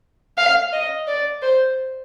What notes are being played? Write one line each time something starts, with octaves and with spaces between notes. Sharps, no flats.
F5
D#5
D5
C5